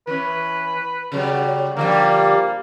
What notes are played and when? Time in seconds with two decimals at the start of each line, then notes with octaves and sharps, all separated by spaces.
0.07 E3 C#4 B4
1.12 C#3 F#3 G3
1.77 D3 F3 G3 A#3